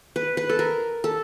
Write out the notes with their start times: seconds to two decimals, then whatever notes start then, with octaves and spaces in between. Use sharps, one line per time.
0.16 B4
0.37 B4
0.49 A4
0.59 A#4
1.04 A4